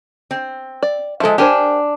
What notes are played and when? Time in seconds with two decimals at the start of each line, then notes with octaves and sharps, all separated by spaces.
0.31 C4
0.83 D5
1.20 F3 G#3 A4 E5
1.38 D4 G4 A#4 C5 G#5